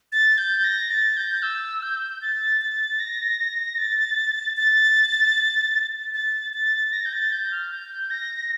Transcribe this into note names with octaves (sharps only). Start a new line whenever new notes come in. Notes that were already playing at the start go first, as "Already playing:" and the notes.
A6
G6
A#6
A6
G6
E6
G6
A6
A6
A#6
A6
A6
A6
A6
A#6
G6
A6
G6
F6
G6
A#6